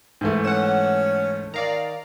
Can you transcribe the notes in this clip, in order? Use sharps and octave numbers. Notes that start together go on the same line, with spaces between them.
G#2 E3 A3
C#4 F#5 E7
D#3 D5 F5 A#5